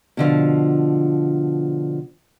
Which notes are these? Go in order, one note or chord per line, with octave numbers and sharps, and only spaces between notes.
B2 D3 F3